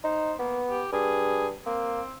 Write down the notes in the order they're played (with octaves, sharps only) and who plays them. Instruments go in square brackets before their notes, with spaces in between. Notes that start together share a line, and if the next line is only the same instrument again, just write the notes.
[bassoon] D#4 [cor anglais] C5
[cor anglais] A#3 [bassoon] B3
[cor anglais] G4
[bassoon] G2 [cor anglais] G#4
[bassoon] A#3 [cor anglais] C4